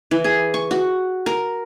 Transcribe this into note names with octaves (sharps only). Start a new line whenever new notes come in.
E3
G#4
C#6
F#4
A#4